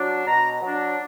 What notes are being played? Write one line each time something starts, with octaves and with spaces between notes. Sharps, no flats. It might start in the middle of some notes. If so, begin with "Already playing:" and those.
Already playing: F#3 D4
B2 A#5
F#3 D4